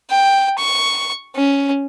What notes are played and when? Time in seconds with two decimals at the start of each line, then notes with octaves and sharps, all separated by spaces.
0.10 G5
0.58 C#6
1.35 C#4